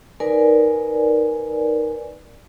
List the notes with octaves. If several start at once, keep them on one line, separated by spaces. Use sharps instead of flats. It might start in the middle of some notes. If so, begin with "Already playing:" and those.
D#4 A#4 B4 D5 G#5